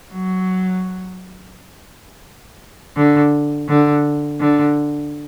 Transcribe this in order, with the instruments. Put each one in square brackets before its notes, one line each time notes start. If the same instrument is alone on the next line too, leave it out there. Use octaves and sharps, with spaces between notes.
[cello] F#3
D3
D3
D3